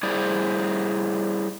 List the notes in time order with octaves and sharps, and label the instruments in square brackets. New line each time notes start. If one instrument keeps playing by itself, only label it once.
[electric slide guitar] G3 E4 G#4 C5 D5